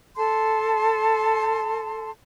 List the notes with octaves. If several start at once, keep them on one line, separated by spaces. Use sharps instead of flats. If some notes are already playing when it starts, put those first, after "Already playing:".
A4 A5 C6